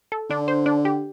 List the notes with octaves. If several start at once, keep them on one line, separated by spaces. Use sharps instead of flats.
A4
D3 D4
C5
D4
G4